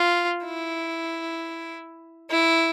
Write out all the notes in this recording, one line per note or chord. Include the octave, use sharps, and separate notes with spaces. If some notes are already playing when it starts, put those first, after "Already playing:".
Already playing: F4
E4
E4